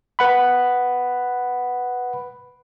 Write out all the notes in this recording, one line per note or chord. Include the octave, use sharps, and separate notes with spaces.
B4 F#5 B5